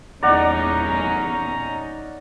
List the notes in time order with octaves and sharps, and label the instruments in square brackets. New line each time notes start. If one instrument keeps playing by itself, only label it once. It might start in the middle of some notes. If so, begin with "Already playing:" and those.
[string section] G1 E2 A#2 [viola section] C#4 D#4 [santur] D5 F#5 [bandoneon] A#5